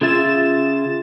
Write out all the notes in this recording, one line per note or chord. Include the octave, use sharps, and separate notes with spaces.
C#3 F4 G#4 E5 A6 E7